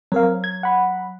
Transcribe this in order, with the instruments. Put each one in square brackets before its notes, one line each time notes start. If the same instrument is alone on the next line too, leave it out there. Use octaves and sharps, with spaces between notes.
[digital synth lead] F#3 [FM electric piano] C4 A#4 F5
[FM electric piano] G#6
F#5 B5